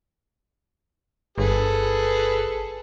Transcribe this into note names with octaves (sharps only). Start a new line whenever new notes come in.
G1 G#4 A4 B4